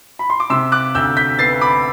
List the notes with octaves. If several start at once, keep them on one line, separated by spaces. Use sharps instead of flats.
B5
C6
D6
C3 C6 E6
D6 F#6
D2 E6 G6
G6 B6
B3 A6 C7
B5 D6